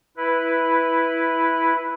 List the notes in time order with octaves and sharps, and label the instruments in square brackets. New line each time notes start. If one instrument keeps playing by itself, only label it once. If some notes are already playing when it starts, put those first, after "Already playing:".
[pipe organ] E4 B4